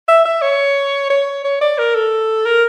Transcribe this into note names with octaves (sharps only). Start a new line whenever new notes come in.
E5
E5
C#5
C#5
C#5
D5
A#4
A4
A#4